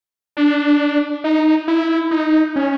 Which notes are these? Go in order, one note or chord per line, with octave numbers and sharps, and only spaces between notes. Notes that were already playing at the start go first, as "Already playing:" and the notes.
D4
D#4
E4
D#4
C#4